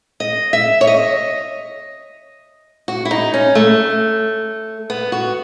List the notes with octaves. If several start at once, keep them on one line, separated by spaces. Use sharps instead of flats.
D#5
E5
C#5
D#5
F#4
E4
D#4
C#4
A3
B3
F#4